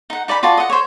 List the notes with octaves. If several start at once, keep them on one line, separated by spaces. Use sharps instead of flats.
D#4 F#5
D#4 D5 F#5 B5
F4 F#4 D5 A5
D#5 F#5
C5 C#5